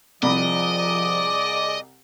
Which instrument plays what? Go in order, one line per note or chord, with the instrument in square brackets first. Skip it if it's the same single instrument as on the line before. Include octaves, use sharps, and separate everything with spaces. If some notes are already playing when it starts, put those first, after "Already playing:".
[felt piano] C2 C3 B5 [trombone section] F3 [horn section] G#4 D5 [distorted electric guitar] D#5